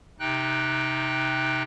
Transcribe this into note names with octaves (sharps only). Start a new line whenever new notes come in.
C3 D#4 G5 F#6